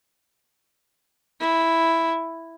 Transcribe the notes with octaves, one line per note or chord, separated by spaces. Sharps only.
E4